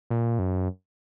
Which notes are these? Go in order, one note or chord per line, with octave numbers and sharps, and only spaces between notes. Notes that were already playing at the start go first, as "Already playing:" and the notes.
A#2
F#2